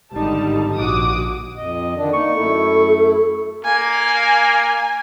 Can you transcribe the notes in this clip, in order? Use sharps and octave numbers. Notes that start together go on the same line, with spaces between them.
G#1 D3 G3 D#4 A5
A#1 F#4 D6 D#6
F2 D#5
D3 D#3 D4 D5
A#3 D#4 C#6
F#2 A3 E4 A4
A#3 G#5